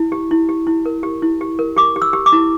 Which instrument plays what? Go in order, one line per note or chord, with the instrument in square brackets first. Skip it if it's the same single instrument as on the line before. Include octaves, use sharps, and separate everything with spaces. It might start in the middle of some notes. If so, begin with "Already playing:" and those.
Already playing: [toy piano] E4
G4
E4
G4
E4
A#4
G4
E4
G4
A#4
G4 D6
G4
E6
G4
D6
E4